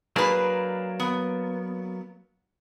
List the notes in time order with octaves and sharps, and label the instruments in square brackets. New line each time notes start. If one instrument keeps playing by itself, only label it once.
[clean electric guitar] F#3 A#3 D4 [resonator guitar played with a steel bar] G#4 B4
[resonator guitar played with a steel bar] B3